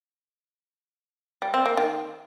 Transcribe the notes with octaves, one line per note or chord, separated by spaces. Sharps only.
G3
C4
A#3
D#3